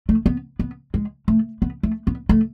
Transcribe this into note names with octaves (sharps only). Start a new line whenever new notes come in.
A3
B3
B3
G#3
A3
B3
A3
B3
A3